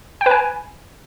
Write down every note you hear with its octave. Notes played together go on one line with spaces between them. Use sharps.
G5
B4
G#5